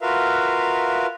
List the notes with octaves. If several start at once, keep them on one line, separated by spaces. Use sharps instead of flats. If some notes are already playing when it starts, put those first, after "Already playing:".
F4 F#4 A#4 B4 E5 F5